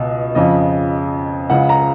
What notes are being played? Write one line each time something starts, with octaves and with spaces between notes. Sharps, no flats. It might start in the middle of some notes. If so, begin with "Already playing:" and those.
Already playing: C#2 B2
F2 C#3 D#5
C#2 C#3 F#5
A#5